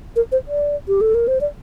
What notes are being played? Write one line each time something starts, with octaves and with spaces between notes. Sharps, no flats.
A#4
C5
D5
G4
A4
A#4
C5
D5